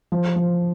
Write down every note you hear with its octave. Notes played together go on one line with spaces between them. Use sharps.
F3
F3